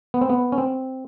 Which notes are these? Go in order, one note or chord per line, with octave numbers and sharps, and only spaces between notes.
B3
C4
B3
C#4
C4